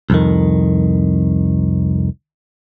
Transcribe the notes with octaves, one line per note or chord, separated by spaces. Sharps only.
C2 F2 D#3